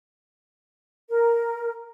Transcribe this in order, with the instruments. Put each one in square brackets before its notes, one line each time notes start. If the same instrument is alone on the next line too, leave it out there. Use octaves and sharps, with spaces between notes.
[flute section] A#4